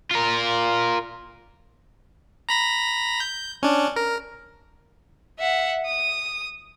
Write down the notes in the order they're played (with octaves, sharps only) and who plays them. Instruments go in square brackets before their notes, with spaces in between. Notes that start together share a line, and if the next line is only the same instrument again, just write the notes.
[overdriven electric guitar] F4 A#4
[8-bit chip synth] A#5 B5 A#6
G6
C#4 D4
A#4
[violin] E5 F#5
D#6